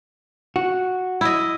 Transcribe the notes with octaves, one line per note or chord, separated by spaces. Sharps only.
F#4
E4 D#5